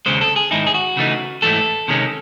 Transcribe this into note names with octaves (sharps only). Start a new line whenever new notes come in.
D#2 C#3 G#3 C5
A4
G#4
G#2 D#3 G#3 D#4 E4
G#4
F#4
C#3 E3 A3 D#4
G#2 E3 A3 A4
C3 D#3 G#3 C#4